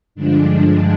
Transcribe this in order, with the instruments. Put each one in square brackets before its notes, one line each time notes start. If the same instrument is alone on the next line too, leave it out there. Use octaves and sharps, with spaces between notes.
[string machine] G2 D3 F3 G#3 D4